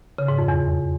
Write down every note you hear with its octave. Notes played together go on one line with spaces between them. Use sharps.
C#3
G#2
F2
E2